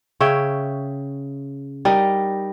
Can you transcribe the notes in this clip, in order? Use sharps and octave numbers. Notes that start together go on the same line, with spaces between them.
C#3 C#5 E5 G5
G3 D#4 A#4 D#5